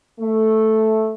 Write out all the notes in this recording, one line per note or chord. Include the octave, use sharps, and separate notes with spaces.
A3